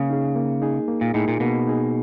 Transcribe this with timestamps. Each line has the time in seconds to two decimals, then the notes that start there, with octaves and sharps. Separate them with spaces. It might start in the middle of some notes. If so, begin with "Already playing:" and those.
Already playing: C#3 A#3
0.10 D#4 G#4
0.35 A#3
0.62 D#4 G#4
0.88 A#3
1.01 A#2
1.14 A2 D#4 G#4
1.28 A#2
1.40 B2 A#3
1.67 D#4 G#4